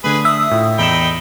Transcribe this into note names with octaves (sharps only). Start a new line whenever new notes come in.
D3 A3 G#4 B4
E5 D#6
A2 F4
E2 D#4 G5 B5 E7